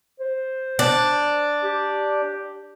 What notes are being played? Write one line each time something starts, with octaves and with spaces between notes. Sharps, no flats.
C5
D4
G4